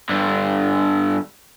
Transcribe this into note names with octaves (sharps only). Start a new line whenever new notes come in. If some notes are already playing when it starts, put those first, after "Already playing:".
G2 D3